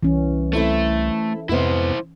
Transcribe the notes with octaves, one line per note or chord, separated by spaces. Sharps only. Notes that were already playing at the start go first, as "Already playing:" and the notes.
C2 E3 C#4
A3 C4 E4 A4
F2 G#2 C3 B3 E4 C5